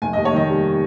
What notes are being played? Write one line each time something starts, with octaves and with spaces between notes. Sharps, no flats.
F1 G#5
D#2 D#5
C#5
D#3 D#5
G3